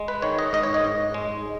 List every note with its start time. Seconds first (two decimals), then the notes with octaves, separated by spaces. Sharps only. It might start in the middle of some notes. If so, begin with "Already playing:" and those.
Already playing: G#3
0.08 B4
0.22 D#3 C#5
0.39 D#5
0.53 G#2 D#5
0.63 C#5
0.74 D#5
0.85 G#2
1.14 G#3